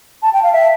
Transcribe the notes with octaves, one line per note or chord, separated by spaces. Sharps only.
A5
G5
F5
E5